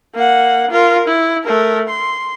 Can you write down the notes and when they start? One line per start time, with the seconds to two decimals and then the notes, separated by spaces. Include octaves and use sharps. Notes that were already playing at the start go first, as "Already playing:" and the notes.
0.15 A#3 F#5
0.71 F4 A#4
1.08 E4
1.44 A3 A#4
1.89 C6